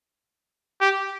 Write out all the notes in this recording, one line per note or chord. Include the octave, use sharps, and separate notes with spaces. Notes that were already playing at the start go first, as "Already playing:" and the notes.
G4